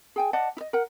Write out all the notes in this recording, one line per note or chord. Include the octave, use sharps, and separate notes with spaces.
G#4 G5 G#5
D5 D#5 F#5 A5
E4 D#5
A#4 F#5